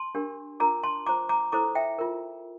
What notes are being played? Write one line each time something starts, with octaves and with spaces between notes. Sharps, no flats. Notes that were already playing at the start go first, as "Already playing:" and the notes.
Already playing: A5 C6
D4 G4 A#4
D4 F4 A#4 A#5 D6
A5 C6
F4 C5 A#5 D6
A#5 D6
E4 A4 C5 A#5 D6
E5 G5
F4 A#4